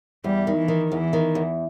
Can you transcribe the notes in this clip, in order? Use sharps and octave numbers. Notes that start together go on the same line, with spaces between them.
E2 G3
D#3
E3
D#3
E2 E3
D#3
E2